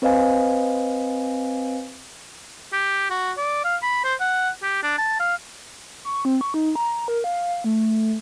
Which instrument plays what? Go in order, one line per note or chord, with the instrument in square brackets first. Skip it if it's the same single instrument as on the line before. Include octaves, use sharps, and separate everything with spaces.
[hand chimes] C4 B4 C5 D#5 F5 G#5
[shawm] G4
F#4
D5
F5
B5
C5
F#5
G4
D4
A5
F5
[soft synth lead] C#6
C4
C#6
D#4
A#5
A#4
F5
A3